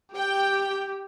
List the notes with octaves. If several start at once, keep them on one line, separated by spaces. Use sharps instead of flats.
G4 G5